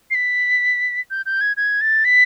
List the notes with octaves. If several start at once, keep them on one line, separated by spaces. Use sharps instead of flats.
C7
B6
G6
G6
G#6
G#6
A6
B6